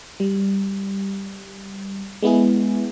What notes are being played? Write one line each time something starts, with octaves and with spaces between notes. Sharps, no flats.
G3
G#3 B3 E4 G#4